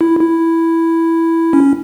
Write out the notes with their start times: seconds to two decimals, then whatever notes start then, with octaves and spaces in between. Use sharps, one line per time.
0.01 E4
0.20 E4
1.53 C#4